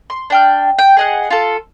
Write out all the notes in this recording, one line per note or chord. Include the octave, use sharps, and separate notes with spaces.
C6
D4 G5 F6
G5
G#4 D#5 F#5
F4 A4